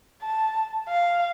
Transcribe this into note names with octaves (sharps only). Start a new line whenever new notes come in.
A5
F5